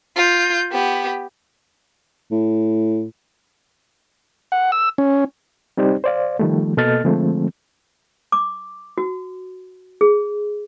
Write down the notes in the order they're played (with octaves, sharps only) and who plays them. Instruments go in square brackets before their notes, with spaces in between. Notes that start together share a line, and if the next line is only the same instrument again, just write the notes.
[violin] F4 G6
B3 G4
[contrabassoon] A2
[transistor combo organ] F#5
E6
C#4
[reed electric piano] G3 C4 D#4 G4 C5 D5
C5 D5 F5
D#3 F3 G3 A3
B2 A#3 A4 D#5 F6 A6
D3 F3 G#3 A3 C4
[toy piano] D6
F#4
G#4